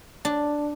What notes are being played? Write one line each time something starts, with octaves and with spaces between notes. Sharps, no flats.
D4